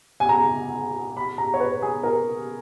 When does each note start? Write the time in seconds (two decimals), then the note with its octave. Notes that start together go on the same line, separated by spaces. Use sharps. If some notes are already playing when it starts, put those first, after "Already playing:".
0.20 G#5
0.29 A#5
1.17 B5
1.38 A#5
1.54 C#5
1.60 B4
1.82 G#4
2.03 A#4